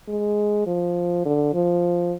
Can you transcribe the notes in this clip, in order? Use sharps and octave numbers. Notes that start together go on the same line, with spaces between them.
G#3
F3
D3
F3